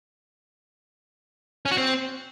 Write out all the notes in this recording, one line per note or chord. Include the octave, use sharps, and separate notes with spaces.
C#4
F#4
C4